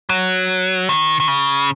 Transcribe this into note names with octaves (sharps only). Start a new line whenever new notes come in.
F#3
D#3
D#3
C#3